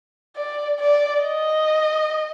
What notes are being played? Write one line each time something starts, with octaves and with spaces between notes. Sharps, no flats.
D5
D5
D#5